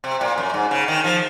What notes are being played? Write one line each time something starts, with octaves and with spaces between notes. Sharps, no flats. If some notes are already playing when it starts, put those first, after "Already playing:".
C3
A#2
F#2
G#2
C#3
D#3
F3